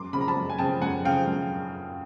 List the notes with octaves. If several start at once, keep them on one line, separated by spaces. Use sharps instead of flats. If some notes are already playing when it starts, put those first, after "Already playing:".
Already playing: F#2 C6 D6
C#3 F3 B5
A#5
A5 B5
F#2
G#5
C#3 F3 G5 A5
F#2 F#5 G#5
C#3 F3 F5 G5
F#2